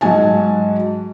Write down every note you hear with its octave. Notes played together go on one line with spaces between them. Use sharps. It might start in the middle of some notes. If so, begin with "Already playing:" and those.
G#2 F#3 F#4 G#5 A5